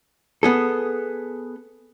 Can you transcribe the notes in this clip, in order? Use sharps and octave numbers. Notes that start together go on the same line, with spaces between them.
B3 G#4 A4